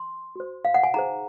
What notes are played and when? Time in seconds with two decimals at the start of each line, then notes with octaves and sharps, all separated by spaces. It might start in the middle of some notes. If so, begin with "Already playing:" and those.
Already playing: C6
0.36 F#4 C5
0.65 F5
0.74 F#5
0.83 G#5
0.94 D#4 G#4 C5 A#5